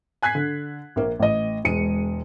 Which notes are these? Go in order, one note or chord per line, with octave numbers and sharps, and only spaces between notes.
G#5 F#6 G#6 B6 C7
D3
A#1 A#3
A1 D#5
E1 G#3 C#7 D#7